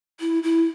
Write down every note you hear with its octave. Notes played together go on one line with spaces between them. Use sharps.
E4
E4